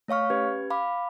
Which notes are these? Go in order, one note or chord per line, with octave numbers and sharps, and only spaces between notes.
A3 C#5 F5 C#6 F6
C#4 G4 B4 G#6
F5 B5 D6